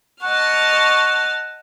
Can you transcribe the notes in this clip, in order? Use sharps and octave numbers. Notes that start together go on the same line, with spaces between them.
D#5 F#5 A5 C#6 F6